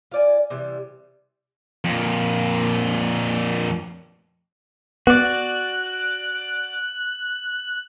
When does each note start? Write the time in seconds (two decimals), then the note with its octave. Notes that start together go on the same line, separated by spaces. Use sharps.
0.12 F4 D5 G#5
0.50 C3 E3 G3
1.85 F2 A#2
5.07 B3 F#4 D5 F#6